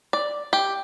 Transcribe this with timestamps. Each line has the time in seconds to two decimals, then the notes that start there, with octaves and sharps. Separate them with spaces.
0.13 D5
0.53 G4